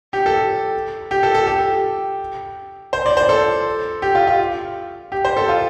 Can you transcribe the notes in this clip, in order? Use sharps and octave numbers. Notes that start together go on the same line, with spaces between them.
G4
A4
G4
A4
A4
G4
C5
D5
C5
A4
G4
F4
F4
G4
C5
A4
F4